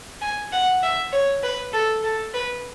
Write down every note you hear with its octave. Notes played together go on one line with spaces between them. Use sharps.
G#5
F#5
E5
C#5
B4
A4
A4
B4